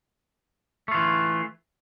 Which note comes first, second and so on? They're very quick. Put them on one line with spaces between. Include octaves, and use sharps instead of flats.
A3 F4 E3